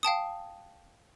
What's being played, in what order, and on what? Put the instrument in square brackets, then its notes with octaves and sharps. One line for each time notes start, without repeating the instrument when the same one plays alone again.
[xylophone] F5 G5 A5 D#6